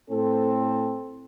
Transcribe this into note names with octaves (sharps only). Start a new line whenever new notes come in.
A2 C4 A4